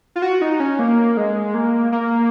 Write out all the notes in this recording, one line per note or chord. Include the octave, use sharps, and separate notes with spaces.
F4
F#4
D#4
C#4
A#3
G#3
A#3
A#3